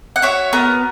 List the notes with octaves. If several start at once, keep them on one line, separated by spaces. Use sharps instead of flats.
F#5
F#4 C#5 E5
B3 A#4